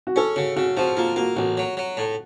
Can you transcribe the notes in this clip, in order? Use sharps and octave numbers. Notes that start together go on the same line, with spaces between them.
F#4
C#4 A4
C#3 F#4
C#3 F#4
F3 F#4
A#3 F4
A#3 F#4
A1 F#4
F#3
F#3
A2